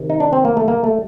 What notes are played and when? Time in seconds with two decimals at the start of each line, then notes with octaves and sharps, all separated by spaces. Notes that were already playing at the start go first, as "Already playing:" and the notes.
Already playing: C3 D#3
0.10 D#4
0.20 D4
0.33 C4
0.45 A#3
0.57 A3
0.68 A#3
0.84 A3